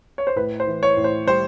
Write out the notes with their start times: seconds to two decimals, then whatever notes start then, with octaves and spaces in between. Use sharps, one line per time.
0.18 C#5
0.27 C5
0.36 A2 B4
0.60 C5
0.67 E3
0.83 C#5
0.97 A2
1.04 C5
1.27 G3 C5